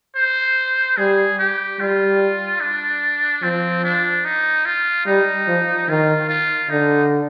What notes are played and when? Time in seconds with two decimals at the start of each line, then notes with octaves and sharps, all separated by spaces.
0.16 C5
0.97 G3 G#4
1.39 G4
1.80 G3 F4
2.61 D4
3.43 F3 C4
3.84 D4
4.25 D#4
4.66 F4
5.06 G3 D#4
5.48 F3
5.89 D#3 F4
6.29 F4
6.70 D3 D#4